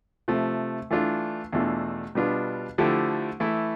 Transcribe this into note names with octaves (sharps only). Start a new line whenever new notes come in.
C3 F3 A3
E3 A3 D4 F4
E2 B2 A3 D4 F4
B2 G3 B3 D4 F4
D3 F3 A3 E4 G4
E3 A3 E4